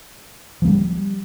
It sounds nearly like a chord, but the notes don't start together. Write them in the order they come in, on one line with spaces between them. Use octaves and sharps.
F3 A#3 G3